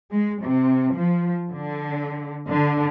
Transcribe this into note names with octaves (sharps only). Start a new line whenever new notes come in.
G#3
C3
F3
D3
D3